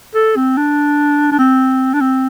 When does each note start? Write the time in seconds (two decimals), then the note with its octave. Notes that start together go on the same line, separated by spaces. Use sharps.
0.15 A4
0.36 C4
0.57 D4
1.32 D4
1.39 C4
1.94 D4
2.01 C4